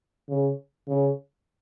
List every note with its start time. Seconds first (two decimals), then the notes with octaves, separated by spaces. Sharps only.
0.29 C#3
0.88 C#3